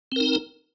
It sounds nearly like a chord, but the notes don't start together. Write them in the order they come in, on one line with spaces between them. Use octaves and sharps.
C4 A#4 D#4